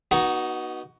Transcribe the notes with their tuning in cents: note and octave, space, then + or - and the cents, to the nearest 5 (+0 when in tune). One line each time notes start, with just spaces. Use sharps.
B3 -25 D#4 +0 F#4 +10